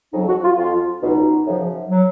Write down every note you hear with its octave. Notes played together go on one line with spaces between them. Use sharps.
F2 C#3 F#3 D#4
F#4
F4
F2 F3 F4
C#2 B2 F#3 D#4
F#2 C#3 F3
F#3